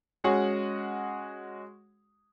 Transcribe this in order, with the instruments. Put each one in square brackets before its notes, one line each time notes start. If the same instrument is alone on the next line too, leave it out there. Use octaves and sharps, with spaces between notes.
[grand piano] G#3 C#4 F#4 G#4 F#5